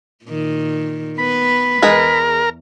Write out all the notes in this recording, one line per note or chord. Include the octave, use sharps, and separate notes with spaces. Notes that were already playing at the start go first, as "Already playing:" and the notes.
A#2 D#3
B3 B4 B5
E2 G#3 G#4 A#4 B4